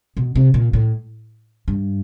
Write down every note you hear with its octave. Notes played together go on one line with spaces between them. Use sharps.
B2
C3
A#2
A2
G2